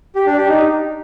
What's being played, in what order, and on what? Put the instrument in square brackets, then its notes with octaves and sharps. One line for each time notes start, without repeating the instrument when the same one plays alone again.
[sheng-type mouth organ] G4
D4
G4
D#4